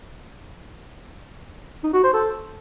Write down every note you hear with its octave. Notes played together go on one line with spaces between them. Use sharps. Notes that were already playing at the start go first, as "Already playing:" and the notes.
D#4
F#4
C5
A4